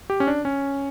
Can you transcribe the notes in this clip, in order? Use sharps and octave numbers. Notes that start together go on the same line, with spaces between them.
G4
C#4
D4
C#4